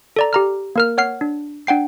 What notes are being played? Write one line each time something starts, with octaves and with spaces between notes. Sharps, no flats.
A4 D5 A#5
G4 A#5 F6
A#3 A#4 F6
C#5 F#5 F6 C7
D4
D4 F#5 G5 C7